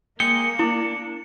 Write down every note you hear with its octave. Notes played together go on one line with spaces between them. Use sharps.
G#3 A#3 G#4 G5 C#7
D4 E4